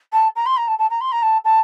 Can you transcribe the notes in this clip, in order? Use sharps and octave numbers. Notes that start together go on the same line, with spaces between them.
A5
A#5
C6
A#5
A5
A5
A#5
C6
A#5
A5
A5